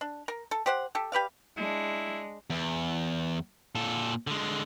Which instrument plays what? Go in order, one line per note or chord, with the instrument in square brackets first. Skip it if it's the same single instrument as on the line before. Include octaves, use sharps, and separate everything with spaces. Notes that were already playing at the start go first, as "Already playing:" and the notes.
[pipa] D4
A#4
A4
G4 C5 F#5
G4 A4
G4 B4 D5 F5
[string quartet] G#3 D4 [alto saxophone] E4
[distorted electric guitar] E2
A#2 A4
D3 G#3